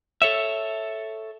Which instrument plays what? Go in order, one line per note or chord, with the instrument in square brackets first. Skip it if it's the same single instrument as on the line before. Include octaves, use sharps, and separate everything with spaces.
[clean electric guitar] A4 C#5 E5